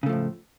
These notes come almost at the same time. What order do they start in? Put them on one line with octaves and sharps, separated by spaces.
C#3 A3 F3 A2